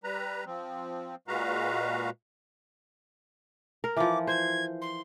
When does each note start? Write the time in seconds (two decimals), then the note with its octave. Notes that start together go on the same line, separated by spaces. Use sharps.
0.04 G3 B4 A#5
0.46 F3 C4
1.28 A#2 G#3 F#4 B4 F5 A#5
3.84 A#4
3.97 E3 F3 D6
4.27 C5 G#6
4.81 C6